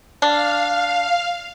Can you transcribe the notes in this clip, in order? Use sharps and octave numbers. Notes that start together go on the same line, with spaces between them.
D4 F5